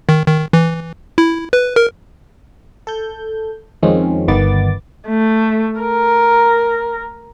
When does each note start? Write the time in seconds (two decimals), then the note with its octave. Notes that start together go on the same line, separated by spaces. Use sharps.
0.09 D#3
0.27 D#3
0.53 E3
1.18 E4
1.53 B4
1.76 A#4
2.87 A4 G6
3.83 F2 D#3 F3 G#3 C4 C#4
4.28 G1 D#3 B3 D6 A6
5.08 A3
5.80 A#4